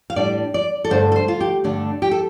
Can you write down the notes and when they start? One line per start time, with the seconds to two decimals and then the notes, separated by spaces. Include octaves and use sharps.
0.10 F5
0.16 A2 G3 D4 D5
0.54 D5
0.84 A4
0.90 G2 D3 A3 D4 C5
1.12 A4
1.16 C5
1.28 F4
1.40 G4
1.64 G2 D3 A3 D4
2.02 G4
2.11 A4